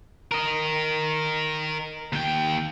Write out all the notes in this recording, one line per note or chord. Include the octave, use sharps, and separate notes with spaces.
A#4 D#5
D#2 G5